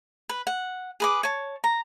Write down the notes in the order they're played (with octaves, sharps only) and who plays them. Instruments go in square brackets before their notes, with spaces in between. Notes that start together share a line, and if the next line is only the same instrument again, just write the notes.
[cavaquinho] B4
F#5
G#4 B4 D6
C#5 A5
A#5